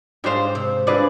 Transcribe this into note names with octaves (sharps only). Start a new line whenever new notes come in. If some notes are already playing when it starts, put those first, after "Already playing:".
G#2 D4 G4 C5 F5
C3
D3 G#4 B4 D5 F5